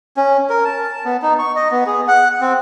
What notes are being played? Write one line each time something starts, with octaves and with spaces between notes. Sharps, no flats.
C#4
A#4
A5
B3
D#4
C#6
D#5
B3
G#4
F#5
C4